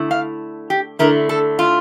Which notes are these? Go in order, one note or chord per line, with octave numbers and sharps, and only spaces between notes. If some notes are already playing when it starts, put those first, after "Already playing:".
Already playing: D3 A3 E4
F5
G4
D3 A3 E4 A#4
A4
F4